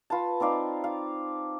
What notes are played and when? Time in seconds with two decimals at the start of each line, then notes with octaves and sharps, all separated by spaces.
0.10 F4 B4 A5
0.40 C4 D#4 D5 F5
0.84 F5